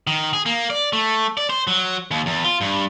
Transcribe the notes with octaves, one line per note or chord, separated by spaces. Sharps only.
D#3
G#4
A#3
D5
A3
D5
C5
F#3
D#2
E2
F4
G2